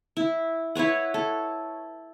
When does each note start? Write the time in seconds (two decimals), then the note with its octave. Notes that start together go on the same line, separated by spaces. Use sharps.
0.17 E4
0.75 E4 B4 C#5 F#5
1.14 A4